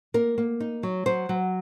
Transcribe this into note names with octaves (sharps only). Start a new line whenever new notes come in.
A#3 A#4
A#3
D#4
F#3
F#3 C5
F#3